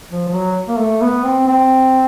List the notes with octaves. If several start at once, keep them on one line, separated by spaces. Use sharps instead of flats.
F3
F3
F#3
A#3
A3
B3
C4
C4